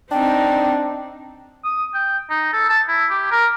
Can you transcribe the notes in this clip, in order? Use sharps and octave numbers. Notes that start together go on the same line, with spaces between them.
C4 D4 D#4 G5
D#6
G5
D#4
A4
A5
E4
G4
A#4